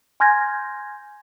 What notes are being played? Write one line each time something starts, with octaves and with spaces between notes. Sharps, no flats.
G#5 C6 F6 G6 G#6 A#6